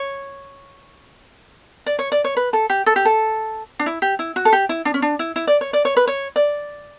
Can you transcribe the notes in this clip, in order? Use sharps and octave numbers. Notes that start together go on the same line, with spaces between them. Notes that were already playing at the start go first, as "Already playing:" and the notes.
Already playing: C#5
D5
C#5
D5
C#5
B4
A4
G4
A4
G4
A4
D4
E4
G4
E4
F#4
A4
G4
E4
D4
C#4
D4
E4
E4
D5
C#5
D5
C#5
B4
C#5
D5